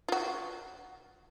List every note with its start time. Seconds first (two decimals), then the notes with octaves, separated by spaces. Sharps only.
0.08 F4 F#4